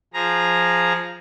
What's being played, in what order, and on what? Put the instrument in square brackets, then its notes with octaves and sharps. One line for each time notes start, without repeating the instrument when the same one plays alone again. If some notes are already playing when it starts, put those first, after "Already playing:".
[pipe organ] F3 G#4 A#5